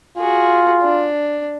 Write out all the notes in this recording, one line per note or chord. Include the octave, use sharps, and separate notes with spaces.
F4 F#4 G#4
D4